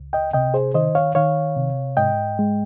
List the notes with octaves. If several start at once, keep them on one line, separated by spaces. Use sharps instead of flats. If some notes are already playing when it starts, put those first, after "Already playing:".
Already playing: C#2
D#5 G5
C3 D#5 G5
G#4 C5
D#3 C5 D#5
C#5 F5
D#3 C#5 F5
C3
G#2 D#5 G5
G#3